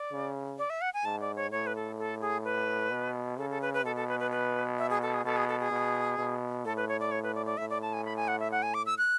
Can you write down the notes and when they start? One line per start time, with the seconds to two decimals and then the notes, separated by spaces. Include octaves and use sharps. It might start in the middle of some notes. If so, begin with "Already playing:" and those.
Already playing: D5
0.12 C#3
0.58 D5
0.70 E5
0.81 F#5
0.94 G#5
1.05 G#2 A5
1.21 D5
1.36 C#5
1.51 A2 C#5
1.67 B4
1.76 A4
1.98 A4
2.21 G#4
2.45 B4
2.92 B2
3.38 C#3 A4
3.50 A4
3.62 B4
3.73 B4
3.84 B2 A4
3.96 A4
4.08 B4
4.19 B4
4.31 B4
4.78 E5
4.90 G#4
5.02 A4
5.13 G#4
5.24 B2 A4
5.36 G#4
5.48 A4
5.60 G#4
5.71 B2
6.18 B2
6.65 A2 A4
6.77 B4
6.88 C#5
7.00 D5
7.11 C#5
7.23 B4
7.35 D5
7.46 D5
7.57 A2 E5
7.70 D5
7.82 A5
7.93 G#5
8.05 B5
8.16 G#5
8.28 F#5
8.40 E5
8.52 F#5
8.63 G#5
8.74 D6
8.86 E6
8.98 F#6